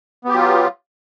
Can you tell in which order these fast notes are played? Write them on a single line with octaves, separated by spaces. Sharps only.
B3 G4 F#3 F4